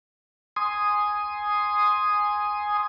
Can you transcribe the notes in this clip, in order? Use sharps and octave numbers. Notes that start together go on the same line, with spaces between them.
G#5 C6 D#6